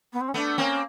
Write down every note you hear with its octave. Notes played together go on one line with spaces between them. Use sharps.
B3
C4
C#4
A3 B3 D4
A#3 C4 C#4